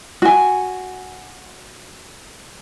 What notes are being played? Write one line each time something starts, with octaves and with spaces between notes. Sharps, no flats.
F#4 G#5